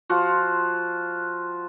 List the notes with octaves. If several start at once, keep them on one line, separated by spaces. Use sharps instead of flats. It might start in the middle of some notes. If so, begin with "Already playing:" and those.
F3 F4 F#4